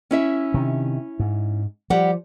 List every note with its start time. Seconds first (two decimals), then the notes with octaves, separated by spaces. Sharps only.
0.11 C#4 E4 E5
0.54 C3 D#3
1.20 G#2
1.90 F3 G3 G4 F#5